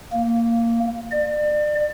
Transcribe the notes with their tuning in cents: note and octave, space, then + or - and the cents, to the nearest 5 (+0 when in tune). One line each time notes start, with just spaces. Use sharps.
A#3 -10
D5 +30